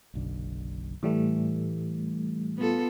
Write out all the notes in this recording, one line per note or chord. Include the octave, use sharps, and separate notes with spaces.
F#1 B1 D3
A2 E3 G3 A3
B3 F4 A4